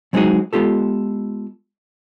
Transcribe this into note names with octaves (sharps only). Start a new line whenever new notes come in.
F#3 G#3 C4 D#4 F#4 G#4
G#3 B3 F4 G4 A4